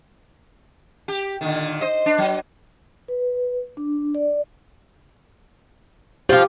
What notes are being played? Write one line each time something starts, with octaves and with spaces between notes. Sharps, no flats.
G4
A#2 D3 D#3
C5 D#5
D4
F#3
B4
D4
D5
F3 F4 G4